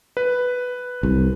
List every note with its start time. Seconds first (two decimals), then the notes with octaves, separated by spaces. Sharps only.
0.17 B4
1.03 C2